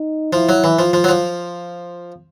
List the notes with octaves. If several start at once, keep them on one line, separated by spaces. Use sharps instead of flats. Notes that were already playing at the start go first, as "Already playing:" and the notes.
Already playing: D#4
F3 E4
F#3
E3
F3 F4
F3
F#3
F3